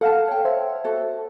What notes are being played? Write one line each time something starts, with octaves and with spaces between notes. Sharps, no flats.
A4 F5 F#5 A5
C#5 G5
C5 C#5 E5
F#4 A4